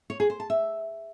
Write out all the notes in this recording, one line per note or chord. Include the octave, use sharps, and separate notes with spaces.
C#5
G#4
C5
A5
E5